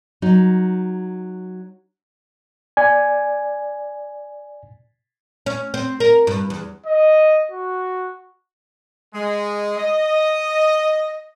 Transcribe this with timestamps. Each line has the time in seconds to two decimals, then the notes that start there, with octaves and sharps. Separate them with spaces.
0.22 F#3 D#4
2.77 D5 G#5
5.46 C#4
5.74 C4
6.00 A#4
6.27 G2
6.50 E2
6.86 D#5
7.51 F#4
9.14 G#3
9.78 D#5